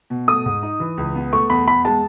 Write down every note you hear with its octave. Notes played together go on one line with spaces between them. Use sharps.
B2
A3 D#6
G#2
D#4
E3
C#2
B3
A3 C#6
E2 B5
E2 B5
G#3 A5